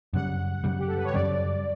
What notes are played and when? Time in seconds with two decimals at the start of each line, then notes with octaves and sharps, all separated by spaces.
0.13 F#2 C#3 G3 F#5
0.64 F#2 C#3 G3
0.79 G4
0.87 A4
0.97 B4
1.04 C#5
1.14 F#2 C#3 G3 D5